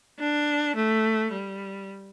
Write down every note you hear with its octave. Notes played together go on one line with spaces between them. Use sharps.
D4
A3
G3